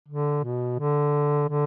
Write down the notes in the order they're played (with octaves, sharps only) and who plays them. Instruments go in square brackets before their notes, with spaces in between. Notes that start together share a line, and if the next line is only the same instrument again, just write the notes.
[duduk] D3
B2
D3
D3